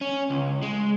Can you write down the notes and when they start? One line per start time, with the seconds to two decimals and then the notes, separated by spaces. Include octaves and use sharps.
0.01 C#4
0.30 C#2
0.62 G#3